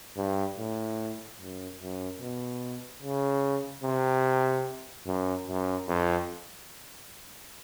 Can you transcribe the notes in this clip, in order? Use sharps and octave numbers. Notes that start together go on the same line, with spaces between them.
G2
A2
F#2
F#2
B2
C#3
C3
F#2
F#2
F2